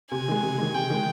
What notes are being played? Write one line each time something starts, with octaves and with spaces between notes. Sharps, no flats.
C3 G#5
D#3 G#3
C3
D#3 G#3
C3 G5
D#3 G#3